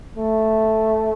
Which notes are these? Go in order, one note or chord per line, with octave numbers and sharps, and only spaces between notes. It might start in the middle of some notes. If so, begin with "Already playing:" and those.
A3